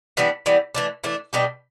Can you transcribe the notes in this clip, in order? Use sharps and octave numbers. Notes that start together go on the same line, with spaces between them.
E3 G3 B3 D4
E3 G3 B3 D4
E3 A3 D4
E3 A3 D4
B2 G3 D4 G4